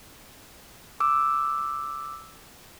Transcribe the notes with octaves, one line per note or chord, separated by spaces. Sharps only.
D6 E6